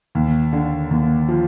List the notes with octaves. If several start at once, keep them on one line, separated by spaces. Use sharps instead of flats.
D#2
D3
D#2
F3